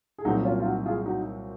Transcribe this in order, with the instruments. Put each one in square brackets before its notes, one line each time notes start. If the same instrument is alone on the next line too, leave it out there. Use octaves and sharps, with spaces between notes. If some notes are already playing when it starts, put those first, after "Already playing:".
[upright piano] G#4
[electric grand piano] C2 A#2 F#3 C4 [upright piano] D#4 F#4
[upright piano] C#4 F4
F4
D#4 F#4
F4 G#4
D#4 F#4